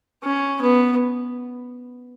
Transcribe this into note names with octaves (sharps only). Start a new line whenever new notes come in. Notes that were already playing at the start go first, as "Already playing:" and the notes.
C#4
B3